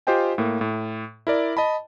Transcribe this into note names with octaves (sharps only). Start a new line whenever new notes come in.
F4 G4 C5 D#5 G5 G#5
A2 A#3
A2
E4 A#4 D5
D#5 A5 B5